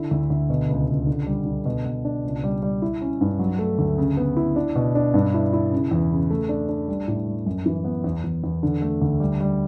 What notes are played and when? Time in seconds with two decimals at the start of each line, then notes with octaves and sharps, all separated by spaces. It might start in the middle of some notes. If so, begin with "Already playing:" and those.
Already playing: D3 E4
0.11 D2
0.30 D2
0.50 B2
0.69 C#2
0.88 C#2
1.07 D3
1.27 G3
1.46 D3
1.65 B2
1.86 B2
2.05 D4
2.24 C#2
2.44 G3
2.63 G3
2.82 E4
3.01 C#4
3.21 G2
3.39 F#3
3.59 A3
3.79 D2
3.98 C#3
4.17 B3
4.37 E4
4.56 D4
4.76 B2
4.95 D4
5.14 G2
5.34 E4
5.53 E4
5.72 C#3
5.91 E2
6.11 C#3
6.30 A3
6.49 D4
6.69 D4
6.88 G3
7.08 A2
7.27 G3
7.46 F#2
7.66 E3
7.85 B3
8.04 E2
8.24 E2
8.44 E2
8.63 D3
8.82 A3
9.02 D2
9.20 G3
9.41 G3